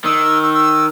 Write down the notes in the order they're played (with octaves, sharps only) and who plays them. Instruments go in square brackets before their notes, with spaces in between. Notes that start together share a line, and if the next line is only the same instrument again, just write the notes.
[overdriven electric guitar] D#3 [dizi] E6
[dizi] E6
E6